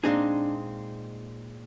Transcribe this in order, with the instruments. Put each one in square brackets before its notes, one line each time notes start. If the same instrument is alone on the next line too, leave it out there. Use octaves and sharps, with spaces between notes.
[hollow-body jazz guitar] A#2 G#3 C4 D#4 G#4 [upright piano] D4